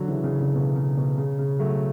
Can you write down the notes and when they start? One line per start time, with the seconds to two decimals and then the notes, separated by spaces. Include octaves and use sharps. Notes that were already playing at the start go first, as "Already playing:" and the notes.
Already playing: D3 F#3
0.08 C#3 E3
0.24 C#3
0.40 C#3
0.55 B2
0.76 C#3
0.97 B2
1.18 C#3
1.39 C#3
1.59 F#3 A3